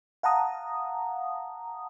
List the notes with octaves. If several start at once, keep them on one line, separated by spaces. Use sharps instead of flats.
F5 F#5 A5 A#5 D#6